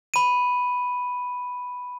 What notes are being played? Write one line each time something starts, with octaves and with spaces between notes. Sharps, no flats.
B5 D#7